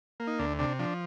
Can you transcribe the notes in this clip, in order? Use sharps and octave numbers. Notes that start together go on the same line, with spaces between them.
A#3
D#4
D2 D4
C3 D4
F3 D4